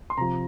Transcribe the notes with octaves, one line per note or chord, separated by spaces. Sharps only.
C6
C3 F3 A#5